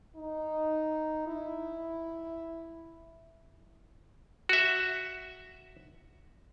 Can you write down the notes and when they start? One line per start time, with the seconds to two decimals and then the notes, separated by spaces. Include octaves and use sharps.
0.16 D#4
1.27 E4
4.49 F#4 E5